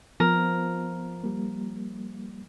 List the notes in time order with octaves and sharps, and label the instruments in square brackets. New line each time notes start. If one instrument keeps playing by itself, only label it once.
[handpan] F3 [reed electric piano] B3 [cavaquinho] A#4
[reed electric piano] G3 A#3